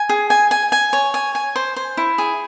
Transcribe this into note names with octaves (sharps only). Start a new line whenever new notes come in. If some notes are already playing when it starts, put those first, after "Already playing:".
Already playing: G#5
G#4
G#5
G#5
G#5
C#5
G#5
G#5
C5
C5
E4
G#4